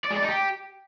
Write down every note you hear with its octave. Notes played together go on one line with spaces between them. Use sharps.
D5
G#3
D5
D#4
G4